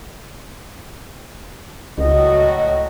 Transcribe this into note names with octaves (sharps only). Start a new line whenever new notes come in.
C#2 A2 F#3 F#4 D#5